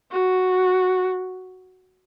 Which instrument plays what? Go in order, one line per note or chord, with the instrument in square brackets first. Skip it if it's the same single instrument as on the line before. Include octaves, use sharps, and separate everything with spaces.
[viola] F#4